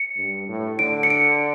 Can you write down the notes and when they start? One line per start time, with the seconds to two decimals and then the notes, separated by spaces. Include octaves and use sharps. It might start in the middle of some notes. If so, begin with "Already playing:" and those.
Already playing: C#7
0.17 G2
0.48 A2
0.79 D3 D7
1.03 C#7
1.10 D7